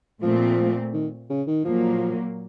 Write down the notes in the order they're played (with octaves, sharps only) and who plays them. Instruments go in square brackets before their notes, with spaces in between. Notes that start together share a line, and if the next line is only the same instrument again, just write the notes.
[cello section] A#2 A3 C4 [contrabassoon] F3
[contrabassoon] D#3
C#3
D#3
[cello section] A#2 F#3 A#3 [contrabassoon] F3